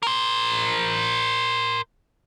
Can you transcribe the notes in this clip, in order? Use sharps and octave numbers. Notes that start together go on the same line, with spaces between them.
A#4 C5